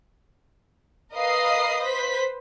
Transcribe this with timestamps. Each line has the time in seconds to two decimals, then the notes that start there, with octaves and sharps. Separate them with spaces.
1.13 A#4 B4 D#5 F5 D#6 C7
1.80 B4 C5 B6